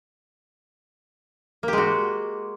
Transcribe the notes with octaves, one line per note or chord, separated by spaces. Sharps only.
G#3 A#3 F#4 G4